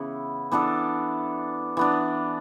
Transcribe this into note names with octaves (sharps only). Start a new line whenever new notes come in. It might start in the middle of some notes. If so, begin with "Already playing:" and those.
Already playing: C#3 E3 B3 E4
E3 B3 D4 A4
E3 B3 D4